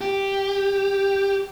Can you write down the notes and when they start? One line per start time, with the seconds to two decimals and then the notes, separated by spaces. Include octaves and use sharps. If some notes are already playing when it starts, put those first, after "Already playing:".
0.01 G4